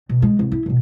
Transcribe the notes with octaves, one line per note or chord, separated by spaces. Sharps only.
B2
G#3
C2
E4
B2 D3